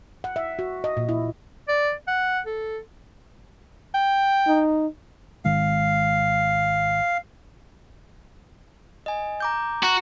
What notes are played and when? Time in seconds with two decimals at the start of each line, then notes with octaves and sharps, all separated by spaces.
0.24 F#5
0.36 E5
0.59 F#4
0.84 D#5
0.97 A#2
1.09 E4
1.68 D5
2.08 F#5
2.46 A4
3.94 G5
4.47 D#4
5.45 G#1 D#3 G#3 F5
9.06 D#5 G#5
9.40 A#5 D6 G6
9.83 F#4 A#5 C#6